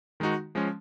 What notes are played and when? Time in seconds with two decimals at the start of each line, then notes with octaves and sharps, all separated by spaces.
0.20 D#3 G#3 D#4 F#4
0.55 F3 G#3 C#4